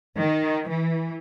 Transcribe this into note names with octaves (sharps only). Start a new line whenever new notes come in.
D#3
E3